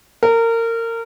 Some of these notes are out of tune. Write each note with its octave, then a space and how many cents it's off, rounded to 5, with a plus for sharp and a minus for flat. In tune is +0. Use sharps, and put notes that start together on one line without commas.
A#4 -25